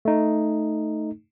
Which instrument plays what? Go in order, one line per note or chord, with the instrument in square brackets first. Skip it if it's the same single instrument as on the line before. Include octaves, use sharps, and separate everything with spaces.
[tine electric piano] A3 D#4